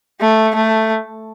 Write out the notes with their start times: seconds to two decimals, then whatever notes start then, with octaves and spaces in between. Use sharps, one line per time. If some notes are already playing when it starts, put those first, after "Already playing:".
0.21 A3
0.55 A3